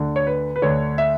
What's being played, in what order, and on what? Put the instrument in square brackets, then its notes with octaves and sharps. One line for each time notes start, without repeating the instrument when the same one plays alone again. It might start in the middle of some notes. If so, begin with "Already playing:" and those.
Already playing: [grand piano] D2 D3
C#5
B4
B4
D2 D3 C#5
E5